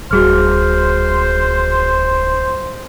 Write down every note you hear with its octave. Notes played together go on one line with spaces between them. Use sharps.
D1 G3 F#4 G#4 C5 F6